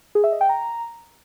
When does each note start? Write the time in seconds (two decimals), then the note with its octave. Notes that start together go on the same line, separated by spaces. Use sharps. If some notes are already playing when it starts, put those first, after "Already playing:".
0.15 G#4
0.24 E5
0.32 D#5
0.41 G5
0.49 A#5